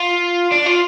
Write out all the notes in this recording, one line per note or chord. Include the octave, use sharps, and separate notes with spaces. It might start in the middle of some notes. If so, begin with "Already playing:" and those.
Already playing: F4
D4
F4